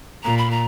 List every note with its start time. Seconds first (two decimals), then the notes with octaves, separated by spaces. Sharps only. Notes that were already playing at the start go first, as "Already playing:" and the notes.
0.23 A#2 A#5
0.38 B5
0.51 A#5